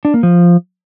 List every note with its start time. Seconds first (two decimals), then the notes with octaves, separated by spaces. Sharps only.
0.05 D4
0.14 A#3
0.23 F3